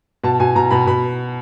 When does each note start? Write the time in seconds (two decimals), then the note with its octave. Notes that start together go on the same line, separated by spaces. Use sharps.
0.24 B2 A5
0.40 B2 G#5
0.55 B2 A#5
0.71 B2 B5
0.87 B2 B5